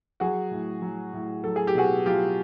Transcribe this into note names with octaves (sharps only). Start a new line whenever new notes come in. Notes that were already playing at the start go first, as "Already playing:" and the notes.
F#3 F#4 G#4
A2
F#3
A2
F#3 A4
G#4
G4
B2 F#4 G#4
F#3 F4 G4